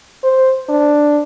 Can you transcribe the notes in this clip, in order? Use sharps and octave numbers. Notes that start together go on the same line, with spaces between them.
C5
D4